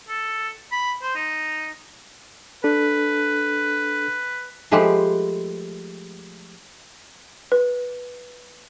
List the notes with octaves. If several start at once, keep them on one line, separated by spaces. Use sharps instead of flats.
A4
B5
C5
D#4
D4 A4 B4
F3 G#3 A3 G4 B4 C5
B4